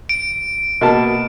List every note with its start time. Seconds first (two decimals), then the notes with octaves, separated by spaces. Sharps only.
0.09 D7
0.81 B2 A#3 A5